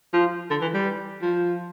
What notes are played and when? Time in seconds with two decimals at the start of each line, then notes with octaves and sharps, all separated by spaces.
0.13 F3
0.50 D3
0.61 E3
0.74 G3
1.22 F3